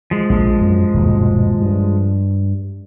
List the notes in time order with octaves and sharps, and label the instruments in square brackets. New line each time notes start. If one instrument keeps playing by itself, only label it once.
[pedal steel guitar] F3 G#3
[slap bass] A#1
F#2
D#1 G2 B2
G2